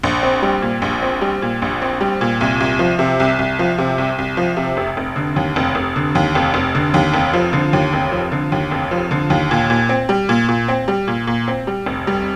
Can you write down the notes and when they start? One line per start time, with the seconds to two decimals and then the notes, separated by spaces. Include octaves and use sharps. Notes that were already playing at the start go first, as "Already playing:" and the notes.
0.03 A#1
0.23 C4
0.42 G3
0.62 A#2
0.82 A#1
1.02 C4
1.22 G3
1.42 A#2
1.62 A#1
1.82 C4
2.01 G3
2.21 A#2
2.41 C2
2.60 C2
2.79 F3
2.99 C3
3.20 C2
3.39 C2
3.59 F3
3.78 C3
3.98 C2
4.18 C2
4.37 F3
4.57 C3
4.77 F1
4.97 F1
5.16 D3
5.36 D#2
5.56 F1
5.75 F1
5.96 D3
6.15 D#2
6.35 F1
6.54 F1
6.75 D3
6.94 D#2
7.14 F1
7.33 F3
7.53 D3
7.73 D#2
7.93 F1
8.12 F3
8.32 D3
8.52 D#2
8.71 F1
8.91 F3
9.11 D3
9.30 D#2
9.51 A#2
9.70 A#2
9.89 C4
10.09 G3
10.29 A#2
10.49 A#2
10.68 C4
10.88 G3
11.08 A#2
11.27 A#2
11.48 C4
11.67 G3
11.86 F1
12.07 G3